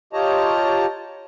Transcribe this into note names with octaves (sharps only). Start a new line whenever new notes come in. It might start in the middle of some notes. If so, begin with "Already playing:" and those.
F4 G4 C#5 D#5 A5 A#5